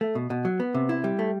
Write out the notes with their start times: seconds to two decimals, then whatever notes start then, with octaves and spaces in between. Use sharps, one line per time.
0.01 A3
0.15 B2
0.30 B2
0.45 F#3
0.60 B3
0.74 C3
0.89 E4
1.04 G3
1.19 A3